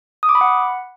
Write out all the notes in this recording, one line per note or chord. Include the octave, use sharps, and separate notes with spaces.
D#6
D6
B5
F#5